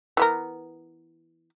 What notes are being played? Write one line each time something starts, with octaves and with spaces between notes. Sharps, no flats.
E3 B3 A#4